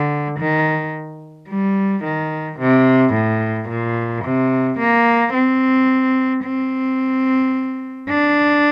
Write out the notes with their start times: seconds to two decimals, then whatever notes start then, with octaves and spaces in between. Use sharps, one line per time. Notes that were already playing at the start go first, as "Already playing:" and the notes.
Already playing: D3
0.39 D#3
1.49 G3
2.04 D#3
2.59 C3
3.14 A2
3.69 A#2
4.24 C3
4.79 A#3
5.34 C4
6.44 C4
8.09 D4